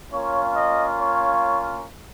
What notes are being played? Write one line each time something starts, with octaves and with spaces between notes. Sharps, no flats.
A#3 C#4 F4 C#5
D#5
C#5